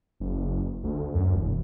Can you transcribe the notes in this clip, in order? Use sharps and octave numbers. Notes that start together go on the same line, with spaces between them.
F#1
D2
F#2
E1